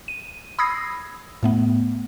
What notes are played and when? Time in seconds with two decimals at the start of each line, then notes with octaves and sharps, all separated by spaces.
0.08 D#7
0.59 B5 D#6 E6 G#6 A#6 C7
1.43 A2 A3 B3